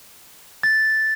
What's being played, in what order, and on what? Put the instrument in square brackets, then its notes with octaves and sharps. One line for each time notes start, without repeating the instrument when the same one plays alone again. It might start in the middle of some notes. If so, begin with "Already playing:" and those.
[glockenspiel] A6